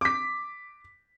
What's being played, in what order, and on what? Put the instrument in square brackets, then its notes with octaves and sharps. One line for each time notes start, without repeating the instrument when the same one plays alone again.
[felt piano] D6 B6